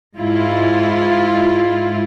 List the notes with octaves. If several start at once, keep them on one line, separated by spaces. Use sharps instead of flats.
G#2 E4 F4